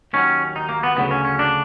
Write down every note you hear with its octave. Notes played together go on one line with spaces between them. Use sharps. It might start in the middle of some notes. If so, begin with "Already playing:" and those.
D#2 D#3 F#3 C#4
D#4
A#3
B3
D2 C#3 F#3 B3
C#4
C#4
D4